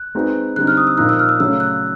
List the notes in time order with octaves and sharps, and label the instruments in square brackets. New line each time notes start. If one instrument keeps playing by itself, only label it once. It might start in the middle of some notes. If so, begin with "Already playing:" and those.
Already playing: [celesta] F#6
[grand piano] G#3 C4 D#4 F#4 B4
[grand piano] D3 G3 C4 D#4 [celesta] F#6
[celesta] F6
D#6
E6
[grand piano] A#2 F3 A#3 D#4 [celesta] F#6
[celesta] E6
F6
E6
[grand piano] C#3 F#3 A3 [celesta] E6
[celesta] F#6